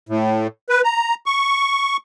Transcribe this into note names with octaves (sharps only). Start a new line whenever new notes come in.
A2
B4
A#5
C#6